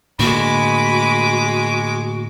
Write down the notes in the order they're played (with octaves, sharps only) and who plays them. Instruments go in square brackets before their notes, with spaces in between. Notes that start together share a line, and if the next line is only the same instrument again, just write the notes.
[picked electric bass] A2 D3 A#3 [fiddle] G#3 D6 [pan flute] F#4 [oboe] B5